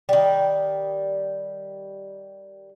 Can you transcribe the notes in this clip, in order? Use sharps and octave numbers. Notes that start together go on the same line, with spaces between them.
D#3 G3